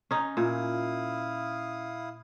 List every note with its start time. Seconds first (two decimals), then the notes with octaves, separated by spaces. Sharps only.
0.11 C#4 D#4
0.37 A#2 E4 F5 D#6